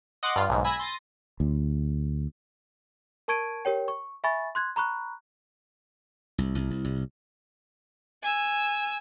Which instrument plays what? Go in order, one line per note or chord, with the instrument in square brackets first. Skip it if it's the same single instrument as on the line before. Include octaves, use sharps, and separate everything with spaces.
[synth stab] D#5 F#5 C6 D6 F#6
G2 F4
B1 G#2
G#5 B5 E6 G#6 A#6
C6 A6 A#6 D#7
[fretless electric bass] D2
[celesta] A#4 A5 C#6 G#6 D7 D#7
G4 A#4 C#5 G5
C#6
E5 G#5 B5 C#6 A6
C6 F#6 G#6
A#5 B5 C#6 F#6
[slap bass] C2
C2
C2
C2
[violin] G#5 E6